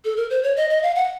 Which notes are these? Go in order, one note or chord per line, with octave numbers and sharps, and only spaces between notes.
A4
A#4
C5
C#5
D#5
D#5
F5
F#5